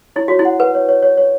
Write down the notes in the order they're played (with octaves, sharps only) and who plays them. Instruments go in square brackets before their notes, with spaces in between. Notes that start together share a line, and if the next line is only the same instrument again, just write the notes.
[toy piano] E4 [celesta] C#5
[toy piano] F#4 [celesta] C#5
[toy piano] E4
[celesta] F#5
[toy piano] B4 [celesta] F#5
[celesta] C#5
C#5
C#5
C#5